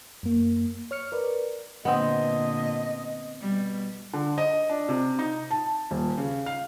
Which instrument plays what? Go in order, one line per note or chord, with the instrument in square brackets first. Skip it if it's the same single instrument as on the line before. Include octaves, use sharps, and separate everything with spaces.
[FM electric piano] F#2 A#3
C#5 F6 C#7
A#4 B4 D5
[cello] A#2 D3 [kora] B3 C4 [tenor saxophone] D#5
[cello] B2 G3
[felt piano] D3
D#5
D4
C3
D#4
A5
D#1
C#3
F5